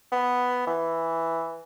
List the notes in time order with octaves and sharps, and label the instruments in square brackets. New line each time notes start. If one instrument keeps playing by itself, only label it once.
[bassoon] B3
E3